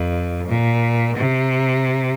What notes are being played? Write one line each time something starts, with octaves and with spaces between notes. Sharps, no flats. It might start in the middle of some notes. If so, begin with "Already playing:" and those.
Already playing: F2
A#2
C3